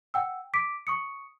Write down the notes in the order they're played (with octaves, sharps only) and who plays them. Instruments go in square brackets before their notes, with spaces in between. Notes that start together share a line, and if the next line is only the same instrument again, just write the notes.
[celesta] F#5 G5 E6
D6 B6 D7
C#6 D#6 C#7